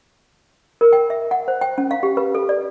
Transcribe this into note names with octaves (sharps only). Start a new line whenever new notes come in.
A#4
G5
E5
F#5
C5
G5
C#4
F5
G4
B4
A4
D5